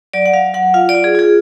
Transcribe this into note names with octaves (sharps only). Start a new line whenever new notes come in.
F#3 D5
F#5
F#3 F5
F#3 F#5
F4 F5
D5
F4
G#4
F4 G#4